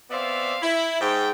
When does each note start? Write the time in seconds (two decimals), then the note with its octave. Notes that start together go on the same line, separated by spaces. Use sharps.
0.10 B3 C4 D5 E5 F5
0.62 E4
1.01 G#2 G5